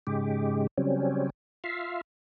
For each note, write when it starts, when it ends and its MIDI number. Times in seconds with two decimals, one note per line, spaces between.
0.07 0.67 44
0.07 0.67 49
0.07 0.67 56
0.07 0.67 67
0.78 1.30 49
0.78 1.30 54
0.78 1.30 55
0.78 1.30 60
0.78 1.30 61
1.64 2.01 65
1.64 2.01 76
1.64 2.01 77